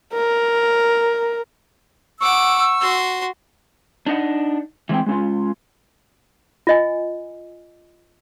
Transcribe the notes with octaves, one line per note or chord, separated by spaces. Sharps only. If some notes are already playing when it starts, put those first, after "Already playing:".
A#4
F#5 C#6 D6 E6
F#4 C6
D4 D#4 D#5 F#5
E3 G#3 C4 G5
G#3 C#4 F4
F4 D#5 G#5